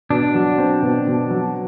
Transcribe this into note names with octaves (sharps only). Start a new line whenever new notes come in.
B2 D4
F#3
C4
B2
B2
F#3